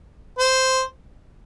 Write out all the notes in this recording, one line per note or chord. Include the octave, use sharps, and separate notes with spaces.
C5